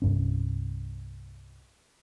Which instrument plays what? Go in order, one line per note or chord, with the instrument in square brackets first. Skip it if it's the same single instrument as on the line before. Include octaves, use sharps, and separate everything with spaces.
[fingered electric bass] C2 G2 C#4